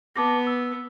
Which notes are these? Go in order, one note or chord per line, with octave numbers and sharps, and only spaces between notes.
B3 A5 D6 A#6
E6